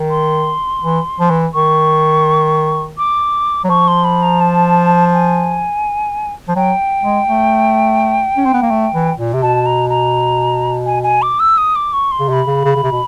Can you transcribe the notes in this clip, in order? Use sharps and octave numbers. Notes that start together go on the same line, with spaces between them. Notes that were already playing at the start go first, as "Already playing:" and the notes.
Already playing: D#3
C6
E3
F3
E3
D#3 C#6
D6
F#3
F3 C#6
C6
B5
A#5
A5
G#5
F3
F#3 G5
G#3
A3
C#4
C4
B3
A#3
A3
E3
A#2
C3
B2 A5
A#5
A#5
G#5
G#5
D6
E6
D#6
D6
C#6
C6
C#3
C3 B5 C6
C#3
C#3
C#3
C3
B2